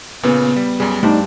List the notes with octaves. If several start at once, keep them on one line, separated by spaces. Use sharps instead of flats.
A#2 C#3 B3
G3
F#2 G3 G#4
G2 A3 C4 D4 D#4 D5